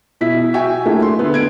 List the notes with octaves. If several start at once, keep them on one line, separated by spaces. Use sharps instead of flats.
B2 E4 B6
F#4 E5 G5 G#5
A3 A#3 D4 E4
C6
D3 B3
G#6 D7